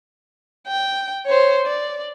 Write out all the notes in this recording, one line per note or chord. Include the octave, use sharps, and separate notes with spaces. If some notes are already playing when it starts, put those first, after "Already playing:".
G5
C5 C#5
D5